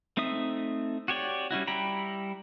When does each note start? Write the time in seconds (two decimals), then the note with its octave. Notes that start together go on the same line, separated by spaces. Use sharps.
0.17 A3 C4 D#4 E5 D#6
1.08 F#4 G4 C#5 D5
1.51 G3 C#4 E4 F#4
1.67 G3 E4 G5 A#5 B5